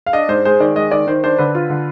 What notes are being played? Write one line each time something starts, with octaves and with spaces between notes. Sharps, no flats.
F5
D4 D#5
G#2 C5
G#3 C5
D#3 D5
G#3 D#5
D#3 D5
D#3 C5
D4 C5
D3 B4
F4
D3